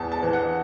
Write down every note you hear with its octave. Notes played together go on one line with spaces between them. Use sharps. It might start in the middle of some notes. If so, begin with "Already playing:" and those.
Already playing: E2 A5
A5
E3
F#5